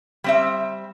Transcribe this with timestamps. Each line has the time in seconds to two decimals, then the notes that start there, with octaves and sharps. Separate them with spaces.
0.24 G3 C4 E5